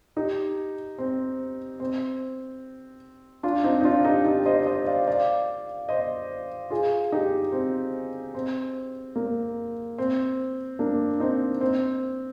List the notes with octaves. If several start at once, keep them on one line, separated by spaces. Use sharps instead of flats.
D#4 G4
C4
C4
D4 F4
C4 D#4
D#4
D4 F4
D#4 G4
D#4 G4
C5 D#5
C5 D#5
D5 F5
D5 F5
C5 D#5
F4 G#4
D#4 G4
C4
C4
A#3
C4
A#3 D4
C4 D#4
C4